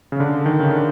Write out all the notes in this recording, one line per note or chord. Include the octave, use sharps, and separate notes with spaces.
C#3
D3
D#3
C#3
D3